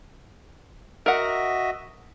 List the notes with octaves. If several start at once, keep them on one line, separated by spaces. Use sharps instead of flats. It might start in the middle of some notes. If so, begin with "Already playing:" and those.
F#4 A#4 D#5 E5 F#5